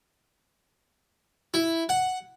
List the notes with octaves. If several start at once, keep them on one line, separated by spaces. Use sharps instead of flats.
E4
F#5